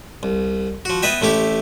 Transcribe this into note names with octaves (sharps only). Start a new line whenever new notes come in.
C2
F3 F#4
B3 B4 D#5 E5 G5
A1 A3 E4 G4